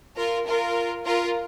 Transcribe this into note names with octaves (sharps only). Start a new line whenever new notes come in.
F4 A#4
F4 A#4
F4 A#4